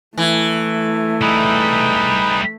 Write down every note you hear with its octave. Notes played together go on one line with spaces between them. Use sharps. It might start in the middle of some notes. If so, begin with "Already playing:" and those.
E3 A3
G3 D#4 E4 G#4 B4